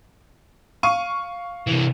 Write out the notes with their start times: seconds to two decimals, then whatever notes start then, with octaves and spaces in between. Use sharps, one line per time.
0.83 F5 C#6 D#7
1.67 C3 E3